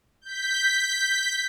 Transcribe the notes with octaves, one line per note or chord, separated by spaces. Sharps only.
G6 B6